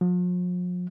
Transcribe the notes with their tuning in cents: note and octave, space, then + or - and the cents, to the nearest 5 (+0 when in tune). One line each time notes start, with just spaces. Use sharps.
F3 +40